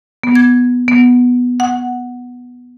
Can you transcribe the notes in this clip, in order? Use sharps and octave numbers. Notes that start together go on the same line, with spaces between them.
B3
G#6
B3
F#5